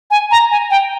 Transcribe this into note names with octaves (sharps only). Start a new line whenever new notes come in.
G#5
A#5
G#5
G5